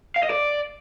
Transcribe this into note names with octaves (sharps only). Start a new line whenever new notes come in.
F5
D#5
D5